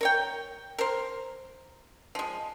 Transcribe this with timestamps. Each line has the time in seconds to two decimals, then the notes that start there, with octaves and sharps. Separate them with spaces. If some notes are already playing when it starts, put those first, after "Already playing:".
0.01 A#4 C#5 G5
0.79 A#4 C5
2.15 F3 G#3